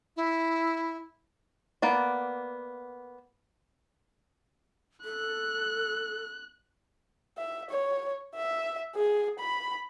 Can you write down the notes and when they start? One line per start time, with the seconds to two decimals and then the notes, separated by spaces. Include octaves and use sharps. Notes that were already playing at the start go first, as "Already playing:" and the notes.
0.17 E4
1.82 A#3 B3 D5
5.04 A4 F#6
7.38 E5
7.70 C#5
8.35 E5
8.95 G#4
9.39 B5